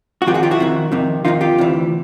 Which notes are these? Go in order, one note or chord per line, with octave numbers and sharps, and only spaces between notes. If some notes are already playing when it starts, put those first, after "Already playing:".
F#4
F2 C3 D#3 F4 G4
F#4 G#4
F4 G4
E4 F#4
F2 C3 D#3
F2 C3 D#3
F2 C3 D#3 D#4 F4
F4 G4
D2 C3 E3